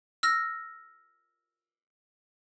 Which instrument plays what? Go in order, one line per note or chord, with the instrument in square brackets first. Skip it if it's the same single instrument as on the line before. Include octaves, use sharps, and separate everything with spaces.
[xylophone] E6 F6 A#6